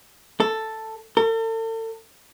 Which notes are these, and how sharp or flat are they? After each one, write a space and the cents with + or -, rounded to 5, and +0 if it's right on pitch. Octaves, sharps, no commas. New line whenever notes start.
A4 +5
A4 +40